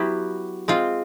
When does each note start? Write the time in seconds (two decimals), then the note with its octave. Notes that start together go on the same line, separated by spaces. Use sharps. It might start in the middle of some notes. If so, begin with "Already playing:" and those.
Already playing: F#3 B3 E4 G4
0.68 G#3 C4 F4